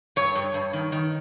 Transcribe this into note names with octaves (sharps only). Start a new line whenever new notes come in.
G2 C#5
G2
G2
D#3
D#3